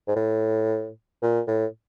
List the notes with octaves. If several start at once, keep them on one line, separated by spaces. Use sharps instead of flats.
G#2
A2
A#2
A2